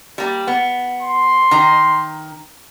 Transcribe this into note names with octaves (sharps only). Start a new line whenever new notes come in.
G3 A#3
B3
C6
D#3 A#5